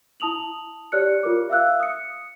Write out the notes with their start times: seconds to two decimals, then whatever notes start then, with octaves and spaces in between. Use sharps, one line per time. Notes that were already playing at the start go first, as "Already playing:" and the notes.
0.20 E4 A5 D#6 F7 F#7
0.92 G4 C#5 D5 F6 F#6 C#7
1.23 F4 A#4 D6
1.50 E5 F5 E6 F#6
1.80 D#6 C#7